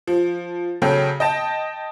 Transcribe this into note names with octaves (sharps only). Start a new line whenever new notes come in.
F3
C#3 F#3 A4 G5
D#5 G5 A5